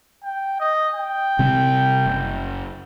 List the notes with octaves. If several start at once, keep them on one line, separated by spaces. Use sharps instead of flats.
G5
D#5
G5
C3 G3 C4
F#1